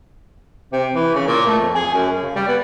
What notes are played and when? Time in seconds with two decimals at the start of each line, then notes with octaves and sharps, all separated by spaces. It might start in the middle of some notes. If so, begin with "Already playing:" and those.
0.73 C3
0.95 E3
1.15 C#3
1.27 A#2
1.46 A3
1.60 F2
1.75 G#4
1.93 F#2
2.22 C#3
2.36 G3
2.48 B3